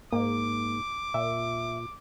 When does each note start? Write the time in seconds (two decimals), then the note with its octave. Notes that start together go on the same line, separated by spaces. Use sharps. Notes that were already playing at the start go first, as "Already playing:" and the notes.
0.13 G#2 A#3 D6
1.14 A#2 E5